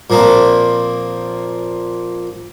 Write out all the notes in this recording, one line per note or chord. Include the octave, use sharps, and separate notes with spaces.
A#2 F3 A#3 C4